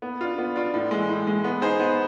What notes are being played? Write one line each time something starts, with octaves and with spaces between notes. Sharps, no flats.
B3
D4 F4
B3
D4 F4
A2
E3 G#3
A2
E3 G#3
B3
D#4 G#4 C5
B3